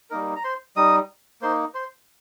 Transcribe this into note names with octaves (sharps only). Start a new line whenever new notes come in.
G3 A#3 D#4 A#4
A#5
C5 C6
G3 D#4 D#5 D#6
A#3 D#4 C5 C6
C5 C6